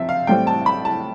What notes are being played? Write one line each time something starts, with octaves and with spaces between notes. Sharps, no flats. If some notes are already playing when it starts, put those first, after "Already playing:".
Already playing: C3 F3 C4 E5
F5
A1 A2 G3 C4 G5
A5
B5
A5